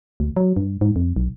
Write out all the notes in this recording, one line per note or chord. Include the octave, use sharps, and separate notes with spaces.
D2
F#3
G2
G#2
F2
B1